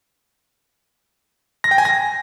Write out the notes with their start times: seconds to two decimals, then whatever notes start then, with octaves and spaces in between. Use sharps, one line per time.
1.64 A#6
1.71 G5
1.78 G#5
1.85 A#6